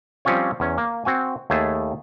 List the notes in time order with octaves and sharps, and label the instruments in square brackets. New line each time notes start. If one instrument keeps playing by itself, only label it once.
[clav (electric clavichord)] F3 G3 C4 C#4 F4 C#5
E2 C#4
A#3
C4 F#4 G#5
D#2 A3 G#4 A5